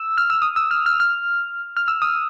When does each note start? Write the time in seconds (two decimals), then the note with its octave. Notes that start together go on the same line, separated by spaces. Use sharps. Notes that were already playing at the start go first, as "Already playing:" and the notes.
Already playing: E6
0.18 F6
0.30 E6
0.42 D#6
0.56 E6
0.71 F6
0.86 F6
1.00 F6
1.77 F6
1.88 E6
2.02 D#6